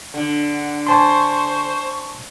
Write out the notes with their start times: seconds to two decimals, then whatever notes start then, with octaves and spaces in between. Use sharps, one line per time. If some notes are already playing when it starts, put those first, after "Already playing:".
0.14 D3
0.54 F#5
0.87 C5 G#5 A5 C6 C#6